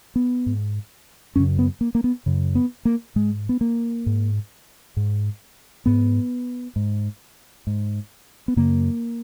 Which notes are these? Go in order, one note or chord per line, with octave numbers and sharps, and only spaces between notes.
B3
G#2
F#2 C#3 C#4
B3
A#3
A#3
B3
F#2 C#3
B3
A#3
G#2 G#3
B3
A#3
G#2
G#2
G#2 B3
G#2
G#2
B3
F#2 C#3 A#3